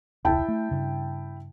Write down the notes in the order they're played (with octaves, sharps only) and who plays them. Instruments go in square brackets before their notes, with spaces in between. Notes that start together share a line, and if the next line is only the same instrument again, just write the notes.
[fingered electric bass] E1 C#2 [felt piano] E4 G5 A5
[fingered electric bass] A3
G2 C#3